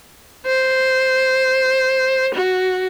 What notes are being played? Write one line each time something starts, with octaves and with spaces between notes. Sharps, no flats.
C5
F#4